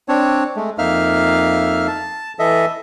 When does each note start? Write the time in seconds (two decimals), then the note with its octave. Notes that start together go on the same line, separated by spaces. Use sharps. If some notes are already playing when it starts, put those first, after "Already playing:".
0.08 C4 D4 C#5
0.56 G#3 A3
0.78 F2 A#3 D#4 E5 F5 F6
1.87 A5
2.39 E3 A4 D#5 E5